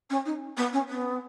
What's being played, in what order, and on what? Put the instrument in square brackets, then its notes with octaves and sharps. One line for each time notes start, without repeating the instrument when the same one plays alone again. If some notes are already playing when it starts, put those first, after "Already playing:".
[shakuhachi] C#4
D#4
B3
C#4
B3